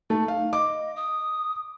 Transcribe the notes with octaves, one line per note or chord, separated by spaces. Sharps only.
A3 D#4
F5
D#5 D6
D#6